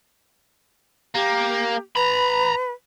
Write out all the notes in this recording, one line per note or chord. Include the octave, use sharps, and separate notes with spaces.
A#3 G4
B4 A#5 B5